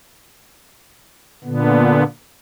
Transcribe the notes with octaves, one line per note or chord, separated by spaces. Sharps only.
A#2 D3 B3